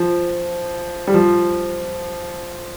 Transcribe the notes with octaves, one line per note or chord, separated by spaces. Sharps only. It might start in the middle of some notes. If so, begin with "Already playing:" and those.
Already playing: F3
G3
F3